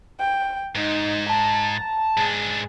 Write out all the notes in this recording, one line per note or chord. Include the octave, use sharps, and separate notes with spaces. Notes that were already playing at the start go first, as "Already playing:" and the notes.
G5
G#2 D#4
A5 A#5
G#2 D4 G#4